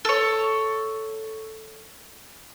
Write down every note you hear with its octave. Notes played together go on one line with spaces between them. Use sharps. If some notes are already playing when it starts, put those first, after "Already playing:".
A4 C#5